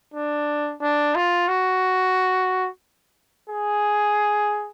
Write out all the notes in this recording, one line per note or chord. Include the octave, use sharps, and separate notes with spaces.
D4
D4
F4
F#4
G#4